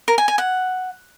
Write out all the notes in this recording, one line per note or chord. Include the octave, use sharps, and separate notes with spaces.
A#4
G#5
G#5
F#5